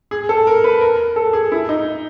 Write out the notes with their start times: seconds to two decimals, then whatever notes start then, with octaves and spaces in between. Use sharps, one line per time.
0.11 G#4
0.29 A4
0.47 A#4
0.64 B4
0.81 A#4
1.16 A4
1.33 G#4
1.52 E4
1.69 D#4